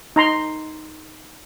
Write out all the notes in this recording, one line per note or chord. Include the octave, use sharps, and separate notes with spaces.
D#4 A#5 C6